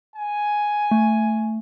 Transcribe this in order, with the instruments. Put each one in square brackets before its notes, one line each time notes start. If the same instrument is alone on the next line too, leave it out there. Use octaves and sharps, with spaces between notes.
[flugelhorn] G#5
[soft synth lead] A3